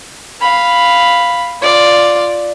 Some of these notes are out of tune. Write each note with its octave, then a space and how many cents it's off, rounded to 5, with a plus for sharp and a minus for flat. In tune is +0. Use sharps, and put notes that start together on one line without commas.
F5 +0 B5 +0
F4 +0 D5 +0